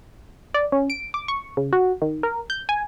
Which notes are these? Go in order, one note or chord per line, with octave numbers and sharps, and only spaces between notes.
D5
C#4
D7
D6
C#6
C#3
F#4
D#3
A#4
G6
G#5